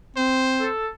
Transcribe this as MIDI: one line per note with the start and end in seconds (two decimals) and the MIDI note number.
0.17 0.69 60
0.17 0.71 72
0.60 0.86 69